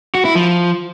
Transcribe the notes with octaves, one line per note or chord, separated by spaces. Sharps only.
F#4
E4
F3